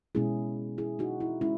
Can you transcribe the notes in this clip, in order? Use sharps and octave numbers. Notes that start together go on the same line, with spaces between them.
B2 G#3 C#4 E4 G#4
E4 G#4
D#4 F#4
E4
G#3 C#4 E4